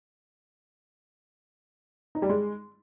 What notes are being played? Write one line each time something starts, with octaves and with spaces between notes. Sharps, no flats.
D#4
G3
G#3